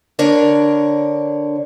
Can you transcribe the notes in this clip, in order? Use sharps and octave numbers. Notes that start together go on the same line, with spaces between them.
D3 D4 A#4 C#5